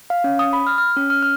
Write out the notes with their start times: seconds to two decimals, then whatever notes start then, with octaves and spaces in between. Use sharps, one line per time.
0.10 F5
0.24 C#4
0.39 D#6
0.53 B5
0.67 F6
0.78 F6
0.97 C#4
1.10 F6
1.23 F6